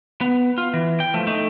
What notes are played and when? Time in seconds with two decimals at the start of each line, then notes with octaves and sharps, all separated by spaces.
0.21 B3
0.58 F4
0.74 E3
1.00 G5
1.14 F3 A3
1.27 A3 D#4